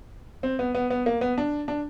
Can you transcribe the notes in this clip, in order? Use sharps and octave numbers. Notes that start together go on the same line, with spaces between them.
C4
B3
B3
B3
A#3
B3
D4
D4